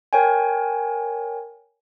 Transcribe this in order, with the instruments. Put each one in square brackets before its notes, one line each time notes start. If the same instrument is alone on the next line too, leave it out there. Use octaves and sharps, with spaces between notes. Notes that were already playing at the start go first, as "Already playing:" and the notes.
[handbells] A#4 C#5 G5 G#5